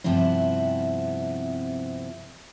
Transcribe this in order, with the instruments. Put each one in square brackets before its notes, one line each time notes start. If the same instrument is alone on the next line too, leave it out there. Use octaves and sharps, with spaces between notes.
[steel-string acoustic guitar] G2 C3 F3 B3 C4 E4